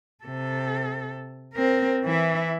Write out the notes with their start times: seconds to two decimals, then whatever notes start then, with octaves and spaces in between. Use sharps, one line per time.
0.24 C3 A4
1.54 C4 A#4
2.05 E3 E4